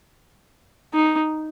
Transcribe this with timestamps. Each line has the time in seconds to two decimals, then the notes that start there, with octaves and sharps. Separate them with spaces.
0.94 D#4